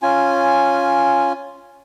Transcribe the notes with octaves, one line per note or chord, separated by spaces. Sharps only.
C#4 F4 G#5